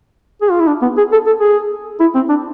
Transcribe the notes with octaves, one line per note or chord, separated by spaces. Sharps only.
G#4
F4
E4
D4
B3
G#4
A4
A4
G#4
E4
C4
D4